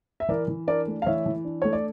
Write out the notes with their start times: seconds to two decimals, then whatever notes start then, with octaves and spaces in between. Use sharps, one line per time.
0.20 E5
0.28 E3 A#4 D5
0.48 E3
0.67 D4 A#4 D5
0.87 A3
1.02 F5
1.06 E3 C#5 E5
1.26 E3
1.45 D4
1.62 A3 C#5
1.73 D5